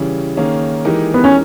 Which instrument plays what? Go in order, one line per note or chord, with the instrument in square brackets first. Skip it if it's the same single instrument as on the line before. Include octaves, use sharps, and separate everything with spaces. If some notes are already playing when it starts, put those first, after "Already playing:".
Already playing: [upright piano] C#3 E3 G3 C#4
D#3 A#3 C#4 G#4
E3 G#3 D#4 G4 A#4
[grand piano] B3
C#4